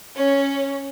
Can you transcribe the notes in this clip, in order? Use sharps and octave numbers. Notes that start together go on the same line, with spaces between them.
C#4 C#5